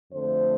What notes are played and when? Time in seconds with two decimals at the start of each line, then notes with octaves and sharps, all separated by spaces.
0.12 F2 D3 A3 C5